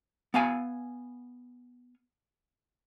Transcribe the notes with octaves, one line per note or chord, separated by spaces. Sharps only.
B3 F5 G#5